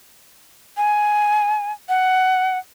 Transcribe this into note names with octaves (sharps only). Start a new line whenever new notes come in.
G#5
F#5